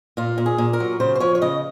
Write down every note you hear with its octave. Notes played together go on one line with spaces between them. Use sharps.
A#2 F4
A#2
G#4
A#2
A#4
F#3
C#3 C5
C5
F3 C#5
C#5
C#3 D#5